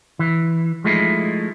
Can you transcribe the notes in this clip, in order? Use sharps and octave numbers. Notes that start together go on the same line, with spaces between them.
E3
F3 G#3 A3 D#4 E4